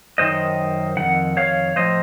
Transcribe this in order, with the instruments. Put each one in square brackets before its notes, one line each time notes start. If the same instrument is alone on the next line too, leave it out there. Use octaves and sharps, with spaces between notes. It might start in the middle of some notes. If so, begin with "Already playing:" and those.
[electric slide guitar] F#2 D#3 C5 D#5
F2 D#3 F#5
C#5 F5
A2 F3 C5 D#5